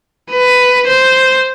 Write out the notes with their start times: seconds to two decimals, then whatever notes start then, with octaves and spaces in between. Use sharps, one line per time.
0.31 B4
0.87 C5